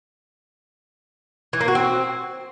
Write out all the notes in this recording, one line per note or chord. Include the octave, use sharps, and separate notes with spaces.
E3
A#3
F#4
C4